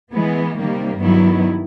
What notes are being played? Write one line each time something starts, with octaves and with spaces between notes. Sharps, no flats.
E3 G#3 B3
C3 D#3 G3 A#3
G2 D#3 F#3 B3 E4